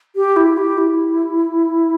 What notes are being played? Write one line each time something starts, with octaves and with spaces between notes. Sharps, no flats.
G4
E4
G4
E4